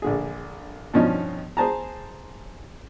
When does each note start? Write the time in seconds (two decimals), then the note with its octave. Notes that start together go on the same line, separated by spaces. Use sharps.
0.02 A#1 D3 G#4
0.94 G2 B2 F3 C#4 D#4
1.57 G#4 C5 A5 A#5